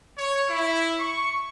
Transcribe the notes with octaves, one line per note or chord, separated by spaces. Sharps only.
C#5
E4
C#6